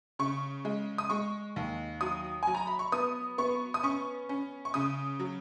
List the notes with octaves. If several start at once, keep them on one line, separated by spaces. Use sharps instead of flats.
C#3 C#6
G#3
D#6
G#3 C#6
D#2
F#3 D#6
F#3 G#5
A#5
B5
C#6
B3 D#6
B3 C#6
D#6
C#4 C#6
C#4
C#6
C#3 D#6
F#3